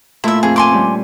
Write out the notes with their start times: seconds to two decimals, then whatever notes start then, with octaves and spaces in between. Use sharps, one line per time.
0.24 A#2 A3 E4 F4 E5
0.43 F2 G#4
0.56 G#5 C6 D6
0.71 G3 C#4